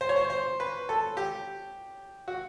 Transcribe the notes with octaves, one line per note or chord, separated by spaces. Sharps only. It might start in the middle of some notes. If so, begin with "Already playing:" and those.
C5
C#5
C5
C5
B4
A4
G4
F#4